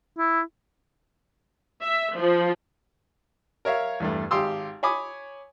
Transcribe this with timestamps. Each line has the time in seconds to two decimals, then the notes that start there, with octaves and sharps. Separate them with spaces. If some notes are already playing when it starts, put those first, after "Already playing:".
0.18 E4
1.83 E5
2.16 F3
3.65 A#4 C#5 E5 F5
4.00 E2 G2 A3
4.31 G#1 G4 F5 C6 D#6 E6
4.83 C#5 G#5 B5 D6 D#6